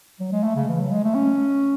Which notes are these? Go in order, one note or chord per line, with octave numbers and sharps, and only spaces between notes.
F#3
G#3
A3
C#3
E3
F#3
G#3
A3
C#4